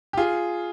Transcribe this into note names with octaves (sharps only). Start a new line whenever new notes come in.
G4
F4 G#4